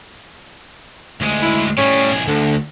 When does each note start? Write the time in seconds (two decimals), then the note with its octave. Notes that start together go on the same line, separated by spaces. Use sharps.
1.21 D2 G#3
1.42 E4
1.78 A2 G3 C#4
2.12 B1 G#4
2.28 D2 D3